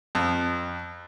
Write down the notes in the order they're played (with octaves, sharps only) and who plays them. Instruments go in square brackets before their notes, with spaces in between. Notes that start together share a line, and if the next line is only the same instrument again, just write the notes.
[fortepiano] F2